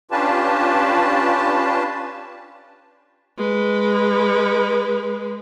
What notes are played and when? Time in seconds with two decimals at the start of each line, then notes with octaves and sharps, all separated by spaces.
0.11 C#4 D4 F4 G4 B4 A5
3.38 G#3 B4